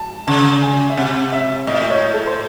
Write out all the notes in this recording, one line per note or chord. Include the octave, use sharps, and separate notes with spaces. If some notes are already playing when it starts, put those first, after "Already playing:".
Already playing: A5
C#3 A5
G#5
E5
C3 F#5
E5
A2 D#5
E5
D#5
C#5
A4
C5